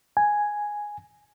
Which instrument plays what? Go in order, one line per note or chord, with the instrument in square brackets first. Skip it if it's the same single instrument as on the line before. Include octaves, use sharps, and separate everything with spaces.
[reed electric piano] G#5